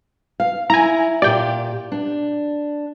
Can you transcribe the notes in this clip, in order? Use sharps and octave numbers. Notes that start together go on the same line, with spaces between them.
F5
E4 G#5 A#5
A#2 G4 D5 G5
D4